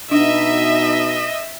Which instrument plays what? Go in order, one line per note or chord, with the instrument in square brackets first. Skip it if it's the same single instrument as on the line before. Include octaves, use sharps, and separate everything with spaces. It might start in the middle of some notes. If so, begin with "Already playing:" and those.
[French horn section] B2 D#4 [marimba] D4 [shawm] D#5 [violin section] E5